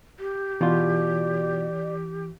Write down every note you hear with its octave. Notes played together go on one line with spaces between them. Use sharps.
G4
B2 E3 F4 D5